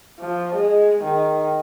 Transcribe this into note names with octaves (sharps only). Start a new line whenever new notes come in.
F3
G#3
D#3